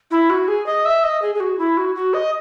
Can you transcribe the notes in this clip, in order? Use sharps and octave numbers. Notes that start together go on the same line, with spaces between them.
E4
F#4
G#4
D#5
E5
D#5
G#4
G#4
F#4
E4
F#4
F#4
D#5